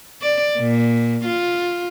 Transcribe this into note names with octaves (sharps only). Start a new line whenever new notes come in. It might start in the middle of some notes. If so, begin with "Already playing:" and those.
D5
A#2
F4